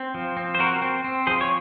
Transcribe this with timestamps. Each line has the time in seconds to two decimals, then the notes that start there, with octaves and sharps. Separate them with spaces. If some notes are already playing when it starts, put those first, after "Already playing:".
Already playing: C4
0.14 F3
0.37 C4
0.55 C5
0.59 C4 F#4 A#4
0.82 C4
1.04 C4
1.27 F3 G#4 C5
1.41 C#5